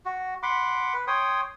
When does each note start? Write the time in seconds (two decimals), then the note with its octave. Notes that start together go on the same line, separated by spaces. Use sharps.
0.05 F#4
0.43 F#5 B5 C6 D6
0.94 B4
1.07 C#5 G5 C6 D#6